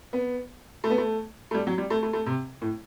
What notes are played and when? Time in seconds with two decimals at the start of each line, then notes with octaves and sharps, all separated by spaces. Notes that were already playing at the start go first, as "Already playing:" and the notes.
0.13 B3
0.84 A3
0.90 B3
0.98 A3
1.51 A3
1.54 G3
1.67 F#3
1.78 G3
1.90 A3
2.03 A3
2.13 A3
2.26 C3
2.62 A2